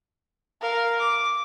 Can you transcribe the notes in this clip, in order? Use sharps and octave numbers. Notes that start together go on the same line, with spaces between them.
A#4 F5
D6